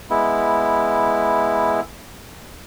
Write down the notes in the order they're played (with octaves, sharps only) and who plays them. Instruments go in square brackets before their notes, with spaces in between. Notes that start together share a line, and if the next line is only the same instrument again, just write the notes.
[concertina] G#3 B3 E4